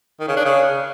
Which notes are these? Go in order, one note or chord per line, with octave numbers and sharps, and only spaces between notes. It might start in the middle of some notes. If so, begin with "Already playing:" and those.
D#3
C#3
D4
C#3